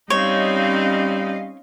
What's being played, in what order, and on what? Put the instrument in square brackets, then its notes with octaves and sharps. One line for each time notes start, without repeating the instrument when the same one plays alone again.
[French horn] G3 [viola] C4 D#4 [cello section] C#4 D#5 F5 [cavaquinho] C#5